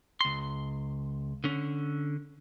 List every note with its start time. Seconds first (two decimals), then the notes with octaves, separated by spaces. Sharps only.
0.21 C#2 C6
1.44 D3 C#4